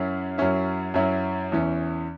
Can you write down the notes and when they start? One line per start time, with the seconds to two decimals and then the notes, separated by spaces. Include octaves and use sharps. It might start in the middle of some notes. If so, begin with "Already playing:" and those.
Already playing: F#2 F#3 C#4 E4
0.38 F#2 F#3 C#4 E4
0.94 F#2 F#3 C#4 E4
1.52 E2 E3 C#4